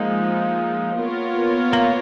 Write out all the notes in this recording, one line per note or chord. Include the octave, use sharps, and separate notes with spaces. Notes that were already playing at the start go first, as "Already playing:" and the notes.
Already playing: F3 G#3 A#3 D#4
B3 F4 A#4 C#5
A#3